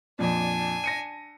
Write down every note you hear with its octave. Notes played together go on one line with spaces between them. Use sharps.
F2 A#2 D4 G#5
A#6 C#7 D#7